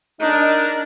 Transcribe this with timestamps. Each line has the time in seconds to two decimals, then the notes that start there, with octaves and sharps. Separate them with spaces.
0.21 D4 D#4 A#4 D#5